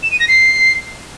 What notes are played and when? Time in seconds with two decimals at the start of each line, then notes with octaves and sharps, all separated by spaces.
0.03 E7
0.11 D#7
0.20 A#6
0.28 C7